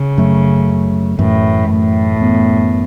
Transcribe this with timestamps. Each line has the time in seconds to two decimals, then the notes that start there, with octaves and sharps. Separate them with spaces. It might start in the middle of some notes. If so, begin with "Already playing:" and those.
Already playing: C#3
0.17 F#2 F#3 A3
1.18 F#2 A2 E3 A3
1.69 A2
2.20 F#2 E3 B3